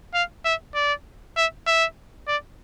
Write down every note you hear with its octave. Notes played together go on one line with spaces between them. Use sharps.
F5
E5
D5
E5
E5
D5